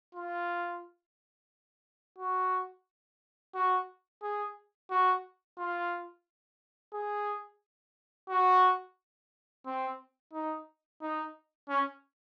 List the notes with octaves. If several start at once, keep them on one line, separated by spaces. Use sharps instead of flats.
F4
F#4
F#4
G#4
F#4
F4
G#4
F#4
C4
D#4
D#4
C#4